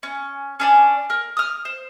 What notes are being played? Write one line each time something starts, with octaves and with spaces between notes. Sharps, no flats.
C#4
C#4 D4 D5
A#4
D#6 F6
C5